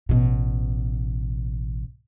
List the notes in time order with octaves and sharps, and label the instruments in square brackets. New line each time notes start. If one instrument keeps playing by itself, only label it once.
[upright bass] A1 B2